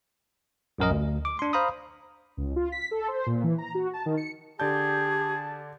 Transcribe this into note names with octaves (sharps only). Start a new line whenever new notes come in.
A#1 F#2 A#4 D#5
D2
D6
D4 C6
C5 F5 A#5 B5 D#6
C#2
F4
B6
A4
C5
A#2
E3
A#5
F#4
A5
D#3
C#7
D3 G4 G#4 D5 A5 G6